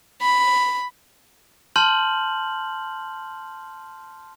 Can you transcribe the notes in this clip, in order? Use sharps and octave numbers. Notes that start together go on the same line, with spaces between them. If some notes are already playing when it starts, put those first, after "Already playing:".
B5
A5 C6 F6 G6 F#7